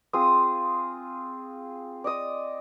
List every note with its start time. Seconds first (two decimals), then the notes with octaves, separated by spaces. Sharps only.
0.13 C4 F4 G#4 D#6
2.04 D5 D#5 D#6